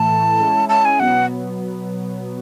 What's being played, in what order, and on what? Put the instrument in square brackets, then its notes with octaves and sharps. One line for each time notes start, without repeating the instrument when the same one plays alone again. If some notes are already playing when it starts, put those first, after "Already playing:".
Already playing: [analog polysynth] A2 E3 A3 [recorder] A5
[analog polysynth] A2 E3 A3
G#3 C#4 E4
[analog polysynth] G#3 C#4 E4 [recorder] A5
[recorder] G#5
[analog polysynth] B2 F#3 B3 [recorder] F#5